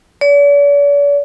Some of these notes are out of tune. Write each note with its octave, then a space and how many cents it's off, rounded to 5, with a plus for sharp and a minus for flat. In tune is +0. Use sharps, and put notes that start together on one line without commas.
D5 -45